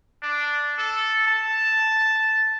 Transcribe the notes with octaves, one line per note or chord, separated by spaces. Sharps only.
D4
A4
A5